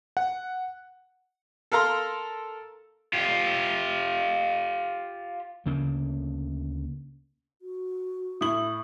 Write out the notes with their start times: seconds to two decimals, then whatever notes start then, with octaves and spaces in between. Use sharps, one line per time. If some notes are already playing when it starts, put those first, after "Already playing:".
0.17 F#5
1.72 A4 A#4 F5 A#5 C6
3.13 F4 G4
5.66 D2 C#3 A#3
7.62 F#4
8.41 A2 E4 D#6 F#7